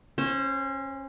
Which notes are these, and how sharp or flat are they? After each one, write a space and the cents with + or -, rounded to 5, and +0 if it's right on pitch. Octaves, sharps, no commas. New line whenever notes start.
C#4 -25 C5 +0